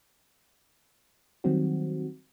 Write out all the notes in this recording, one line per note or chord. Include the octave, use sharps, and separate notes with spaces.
D#3 F#3 G3 C4 F#4